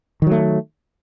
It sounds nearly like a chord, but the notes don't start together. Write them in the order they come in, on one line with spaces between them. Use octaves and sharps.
D#3 F#3 A3